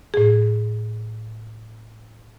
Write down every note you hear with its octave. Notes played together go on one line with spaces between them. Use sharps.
A2 G#4